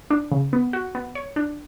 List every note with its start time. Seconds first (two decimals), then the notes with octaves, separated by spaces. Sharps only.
0.10 D4
0.32 C#3
0.53 B3
0.73 F#4
0.95 B3
1.15 C#5
1.36 D4